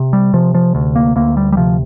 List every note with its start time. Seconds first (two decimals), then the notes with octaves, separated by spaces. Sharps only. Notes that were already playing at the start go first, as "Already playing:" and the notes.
Already playing: C3
0.13 G3
0.33 C3 F3
0.55 F3
0.75 D2
0.96 A#3
1.16 D2 A#3
1.37 G3
1.52 G3
1.57 C3 F3